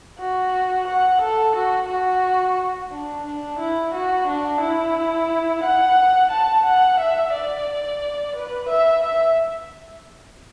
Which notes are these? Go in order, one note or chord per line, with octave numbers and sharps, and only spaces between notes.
F#4
F#5
A4
F#4
F#4
D4
D4
E4
F#4
D4
E4
F#5
A5
F#5
E5
D5
B4
E5
E5